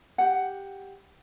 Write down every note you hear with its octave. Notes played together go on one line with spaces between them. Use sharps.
G4 F#5